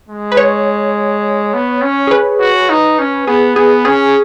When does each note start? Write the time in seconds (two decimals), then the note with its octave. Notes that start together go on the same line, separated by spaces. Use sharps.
0.09 G#3
0.32 B4
0.37 C#5
1.54 B3
1.82 C#4
2.07 G#4
2.11 B4
2.40 F#4
2.69 D#4
2.99 C#4
3.27 B3 G#4
3.56 B3 G#4
3.85 C#4 G#4